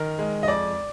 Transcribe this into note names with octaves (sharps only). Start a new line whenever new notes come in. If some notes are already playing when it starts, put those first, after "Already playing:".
Already playing: D#3 A#4
G#3
D#5
F2 D5